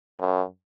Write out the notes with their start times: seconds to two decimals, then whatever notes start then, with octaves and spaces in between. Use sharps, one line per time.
0.20 F#2